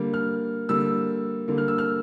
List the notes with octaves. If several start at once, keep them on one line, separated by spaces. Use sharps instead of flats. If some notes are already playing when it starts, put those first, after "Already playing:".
Already playing: D3 G3 A#3
F6
D3 G3 A#3 E6
D3 G3 A#3
F6
E6
F6